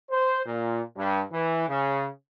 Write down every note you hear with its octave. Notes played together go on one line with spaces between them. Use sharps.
C5
A#2
G2
E3
C#3